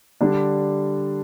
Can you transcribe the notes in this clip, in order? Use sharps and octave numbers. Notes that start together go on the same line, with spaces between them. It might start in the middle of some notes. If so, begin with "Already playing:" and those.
D3 G3 D4